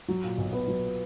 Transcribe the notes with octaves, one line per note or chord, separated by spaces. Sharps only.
F#3
A#2
B1
B3
F#3